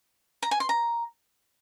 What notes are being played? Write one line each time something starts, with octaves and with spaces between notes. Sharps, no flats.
A#5
G#5
C6
A#5